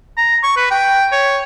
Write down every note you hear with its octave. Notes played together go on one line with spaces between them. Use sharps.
A#5
C#6
B4
G5
C#5